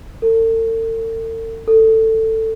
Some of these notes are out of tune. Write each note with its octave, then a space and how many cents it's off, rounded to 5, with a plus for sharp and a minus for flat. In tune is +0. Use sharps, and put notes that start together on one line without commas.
A4 +45
A4 +15